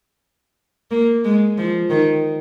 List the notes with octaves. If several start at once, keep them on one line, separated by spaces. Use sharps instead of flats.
A#3
G#3
F3
D#3